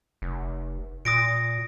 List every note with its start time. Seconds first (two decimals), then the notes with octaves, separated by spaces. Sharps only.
0.22 F1
1.05 A#2 D#6 A#6 D7